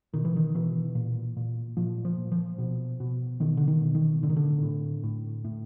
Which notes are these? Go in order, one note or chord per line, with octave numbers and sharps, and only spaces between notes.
B2 D#3
E3
D#3
B2 E3
A#2
A#2
A#2 F3
F3
A#2
F3
B2
B2
B2 D#3
D3
D#3
B2
D#3
A2 D3
D#3
D3
A2
A2
A2